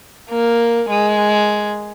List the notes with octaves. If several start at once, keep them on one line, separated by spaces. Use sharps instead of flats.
A#3
G#3